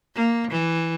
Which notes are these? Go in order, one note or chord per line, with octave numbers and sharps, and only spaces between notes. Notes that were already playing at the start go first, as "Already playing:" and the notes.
A#3
E3